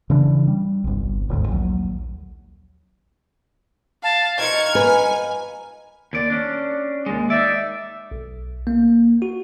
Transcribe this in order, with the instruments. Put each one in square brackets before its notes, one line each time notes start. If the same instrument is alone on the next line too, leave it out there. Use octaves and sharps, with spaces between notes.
[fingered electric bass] C#3 E3 D4
G3
G1 C2
D#1 D2 G#2
A#1 D#2 F#3
[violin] F5 [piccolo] A5
[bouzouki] F3 D#4 A#4 [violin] C#6 G#6 [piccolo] F6
[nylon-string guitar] B4 [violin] G#5
[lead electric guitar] D#2 D5
C#4 D4
D#2 G#3
[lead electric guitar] D#4 D5 [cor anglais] E5
[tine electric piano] B1
A#3
F#4